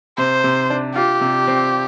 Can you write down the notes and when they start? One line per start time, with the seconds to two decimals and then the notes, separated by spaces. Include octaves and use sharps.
0.18 C3 C5
0.44 C3
0.70 D4
0.95 F4 G4
1.21 C3
1.47 C4